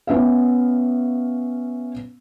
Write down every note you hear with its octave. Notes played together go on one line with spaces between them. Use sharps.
B3 C#4 E5 F5